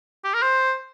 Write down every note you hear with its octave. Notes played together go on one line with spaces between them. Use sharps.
G4
A#4
C5